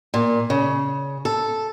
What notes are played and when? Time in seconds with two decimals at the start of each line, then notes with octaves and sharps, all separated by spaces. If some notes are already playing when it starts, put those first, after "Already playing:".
0.14 A#2
0.50 C#3
1.25 A4